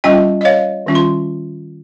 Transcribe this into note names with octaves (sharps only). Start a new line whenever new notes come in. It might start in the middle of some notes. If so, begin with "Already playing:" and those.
G3 C#4 F4 D#5 G5
D#5
C#5 F5
D#3 G3 C#4 F4
C6